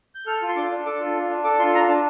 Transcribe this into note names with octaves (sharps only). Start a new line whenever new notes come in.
G6
A4 F6
F4
C6
D4 D6
D4
A4 D6
F4
D4
D4
A4 D6
F4 C6
D4 A#5
D4 A5